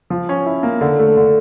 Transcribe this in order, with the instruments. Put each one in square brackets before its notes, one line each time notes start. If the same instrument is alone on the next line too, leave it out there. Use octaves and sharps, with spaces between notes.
[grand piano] F3
C#4
E4
A#3
D3
A3
D3